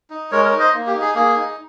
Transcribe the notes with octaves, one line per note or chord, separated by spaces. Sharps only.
D#4
G#3 A#4 C#5
A#4 C#5
D#4
C5 D#5
A#3
G4
D#4
G#4
A#3 G#4
D#4